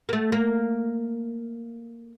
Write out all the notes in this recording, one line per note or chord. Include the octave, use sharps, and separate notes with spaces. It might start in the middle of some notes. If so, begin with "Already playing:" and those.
A#3
A3
A#3